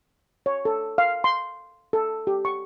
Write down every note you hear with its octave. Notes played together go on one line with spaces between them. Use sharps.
C#5
A4
F5
C6
A4
G4
C#6